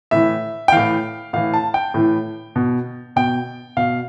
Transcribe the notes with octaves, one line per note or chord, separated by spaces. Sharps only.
A2 E3 E5
G5
A2 E3 F5
A2 E3 F5
A5
G5
A2 E3
B2
B2 G5
B2 F5